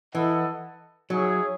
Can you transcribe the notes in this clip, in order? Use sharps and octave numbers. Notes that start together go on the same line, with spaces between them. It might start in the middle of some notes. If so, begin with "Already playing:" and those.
E3 E4 A4 D#5 F#5
F#3 D#4 G#4 C#5 E5